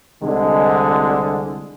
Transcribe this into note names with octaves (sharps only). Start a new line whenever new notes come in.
C2 D3 G#3